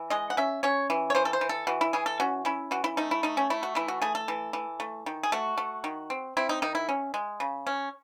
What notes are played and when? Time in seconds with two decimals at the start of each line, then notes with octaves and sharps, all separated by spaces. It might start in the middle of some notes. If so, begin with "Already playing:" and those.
Already playing: E3
0.10 G#3 D#5
0.30 F#5
0.37 C#4 E5
0.63 C#4 C#5
0.90 E3
1.10 C#5
1.15 E3 C5
1.25 A4
1.33 C5
1.41 E3
1.49 A4
1.67 E3 F#4
1.81 E4
1.93 E3 G#4
2.06 A4
2.20 C#4 F#4
2.45 C#4 E4
2.71 E3 F#4
2.84 E4
2.97 A3 D#4
3.11 E4
3.23 A3 D#4
3.37 C#4
3.50 A3 E4
3.63 F#4
3.75 E3 E4
3.88 F#4
4.02 A3 G#4
4.15 A4
4.28 E3
4.53 E3
4.80 A3
5.06 D#3
5.23 G#4
5.32 A3 F#4
5.58 A3
5.84 D#3
6.10 C4
6.37 C4 E4
6.49 D#4
6.62 D#3 D#4
6.75 E4
6.89 C#4
7.14 G#3
7.40 C#3
7.67 C#4